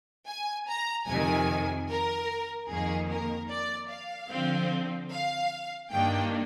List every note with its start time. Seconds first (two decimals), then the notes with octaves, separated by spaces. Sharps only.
0.27 G#5
0.68 A#5
1.08 F2 C3 D#3 G#5
1.88 A#4
2.69 F2 D#3 A#3 G#4
3.09 A#4
3.50 D5
3.90 F5
4.30 D3 F3 C4
5.11 F5
5.92 G2 D#3 A#3 D4 G5